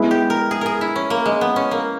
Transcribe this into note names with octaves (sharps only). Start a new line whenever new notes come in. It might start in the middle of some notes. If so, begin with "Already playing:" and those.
Already playing: G#3 B3 E4
G4
A#4
G#4
G#4 A#4
E4
C#4
A#3
G#3
B3
C#4
A#3